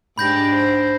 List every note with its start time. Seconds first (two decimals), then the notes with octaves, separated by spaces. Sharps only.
0.18 G#2 D4 G4 B5 G6 A#6
0.54 C5